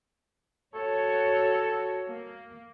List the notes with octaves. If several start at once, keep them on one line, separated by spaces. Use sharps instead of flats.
F#4 A4 C#5
A#3